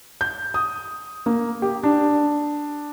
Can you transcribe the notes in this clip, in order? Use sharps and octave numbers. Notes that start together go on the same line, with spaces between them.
G6
D#6
A#3
G4
D4